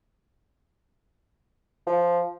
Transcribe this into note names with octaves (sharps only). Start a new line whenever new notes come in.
F3